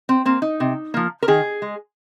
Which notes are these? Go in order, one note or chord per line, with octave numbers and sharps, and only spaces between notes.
C4
A#3 C4
D#4
C3
F3 A#3
A#4
D#3 G#4
G#3